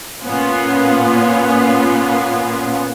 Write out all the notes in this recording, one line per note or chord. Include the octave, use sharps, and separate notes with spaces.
A#2 B3 C#4 F4